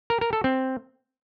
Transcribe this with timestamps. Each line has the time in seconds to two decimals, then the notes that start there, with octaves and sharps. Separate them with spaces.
0.10 A#4
0.21 A#4
0.33 A4
0.44 C4